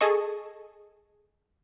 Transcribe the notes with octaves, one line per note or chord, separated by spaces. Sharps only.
G#4 A4 D#5 A5 C#6